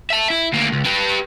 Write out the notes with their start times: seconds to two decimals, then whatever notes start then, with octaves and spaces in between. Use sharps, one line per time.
0.10 E5 A5
0.30 E4
0.53 D2 A#3
0.72 C#2
0.85 G4 B4